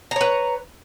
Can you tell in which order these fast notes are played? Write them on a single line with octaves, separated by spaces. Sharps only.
A#5 C#5 B4